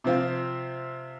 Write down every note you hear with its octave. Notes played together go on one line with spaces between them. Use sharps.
C3 F3 C4 F4